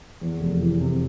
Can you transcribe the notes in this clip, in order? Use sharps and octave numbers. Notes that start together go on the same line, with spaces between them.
E2
F1
E3
C3